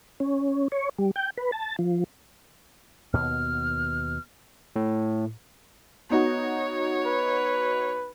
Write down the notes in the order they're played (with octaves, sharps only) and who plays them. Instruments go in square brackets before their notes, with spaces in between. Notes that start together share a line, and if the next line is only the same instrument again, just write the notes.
[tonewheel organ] C#4
C#5
G3
G5
B4
A5
F3
[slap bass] D#2 B2 B3 [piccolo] F6
[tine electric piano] A2
[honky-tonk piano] B3 D#4 F#4 [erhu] C#5
[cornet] B4